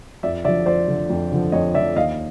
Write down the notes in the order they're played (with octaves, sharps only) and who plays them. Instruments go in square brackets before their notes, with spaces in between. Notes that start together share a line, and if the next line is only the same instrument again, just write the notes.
[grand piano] F2 D5 E5
D3 D5 E5
F3
F2 C5 D5
D3 F3
F2
D3 F3
F2 C#5 D#5
D3 F3 D5 E5
D#2 D#5 F5